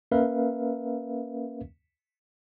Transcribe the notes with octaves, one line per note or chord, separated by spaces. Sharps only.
A#3 C#4 A#4 B4 E5 F5